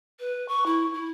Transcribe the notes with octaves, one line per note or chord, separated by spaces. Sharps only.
B4
C#6
E4
E4